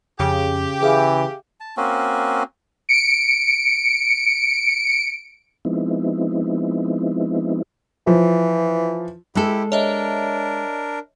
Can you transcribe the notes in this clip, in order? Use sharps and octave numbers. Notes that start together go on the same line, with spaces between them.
F2 C#3 G4
E3 G#4 E5 F5
A5
A#3 C4 C#4 F#4
C#7 D7
F3 G#3 B3 C4 D#4 E4
E3 F3
G#3 E4 G4 A4
D4 A#4 C#5 D#5 E5